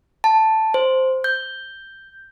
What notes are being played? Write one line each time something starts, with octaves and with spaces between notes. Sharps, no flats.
A5
C5
G6